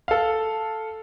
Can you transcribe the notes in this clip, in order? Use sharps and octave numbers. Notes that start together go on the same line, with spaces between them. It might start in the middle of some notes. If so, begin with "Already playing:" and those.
A4 F5